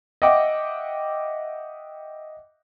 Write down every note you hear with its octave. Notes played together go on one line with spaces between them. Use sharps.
D#5 E5 F#5 G5 D6